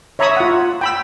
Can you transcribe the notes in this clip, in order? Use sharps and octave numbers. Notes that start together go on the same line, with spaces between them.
C#5 E5 A#5 B5 C#6 D#6
F4 F#5
G5 B5 E6